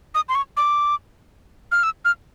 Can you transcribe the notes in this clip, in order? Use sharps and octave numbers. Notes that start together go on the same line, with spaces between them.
D#6
C6
C#6
D6
F6
E6
F6